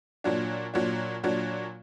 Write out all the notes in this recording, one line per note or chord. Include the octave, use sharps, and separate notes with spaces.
A#2 F#3 D4
A#2 F#3 D4
A#2 F#3 D4